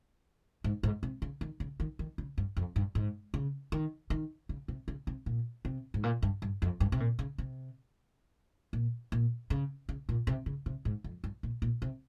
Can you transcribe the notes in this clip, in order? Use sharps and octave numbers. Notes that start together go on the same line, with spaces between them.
G#2
G#2
C3
C#3
D#3
C#3
D#3
D#3
C#3
G2
F2
G2
G#2
C#3
D#3
D#3
C#3
C3
C#3
C3
A#2
C3
G#2
A#2
G2
G2
F2
G2
C3
A#2
C#3
C3
A#2
A#2
C#3
C#3
A#2
C3
C#3
C3
G#2
F2
G2
A#2
A#2
C3